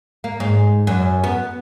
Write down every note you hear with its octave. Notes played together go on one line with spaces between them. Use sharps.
A#3
G#2
F#2
B3